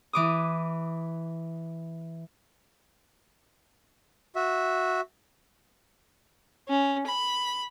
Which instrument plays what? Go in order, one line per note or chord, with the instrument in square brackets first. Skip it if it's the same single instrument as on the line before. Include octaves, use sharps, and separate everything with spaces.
[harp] E3 D6 D#6
[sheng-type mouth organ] F#4 E5
[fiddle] C#4
B5